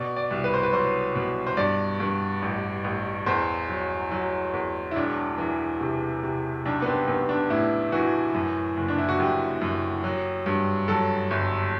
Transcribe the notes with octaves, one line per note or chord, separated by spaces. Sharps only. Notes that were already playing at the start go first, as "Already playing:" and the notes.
Already playing: B2 D5
D5
C2
B4
C5
B4
F#3 C5
B2
C5
G2 D5
G2
A1
A1
E2 C5
F#3
F#3
E2
E4
E1 D4
E3
C3
C3
B1 D4
B3
C4
B1 B3
D4
A2 E4
E3 F#4
F#2
F#1
D4
E4
F#4
F#2 G4
F#2
F#3
G2
F#3 A4
G1